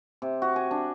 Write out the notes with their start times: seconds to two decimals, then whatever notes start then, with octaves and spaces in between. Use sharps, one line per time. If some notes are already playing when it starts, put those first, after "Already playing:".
0.22 C3
0.42 F#4
0.56 G#5
0.71 D4